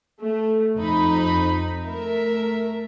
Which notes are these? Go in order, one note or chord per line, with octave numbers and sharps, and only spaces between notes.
A3
F2 D#4 B5
A3 A#4 E5